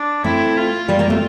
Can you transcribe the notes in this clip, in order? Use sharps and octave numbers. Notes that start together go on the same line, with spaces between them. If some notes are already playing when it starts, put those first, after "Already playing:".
Already playing: D4
A3 C4 E4
F4
G3 A#3
G3 A#3
A3 C4